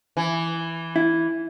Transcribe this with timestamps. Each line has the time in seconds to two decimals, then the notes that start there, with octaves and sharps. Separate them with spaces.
0.17 E3
0.96 E4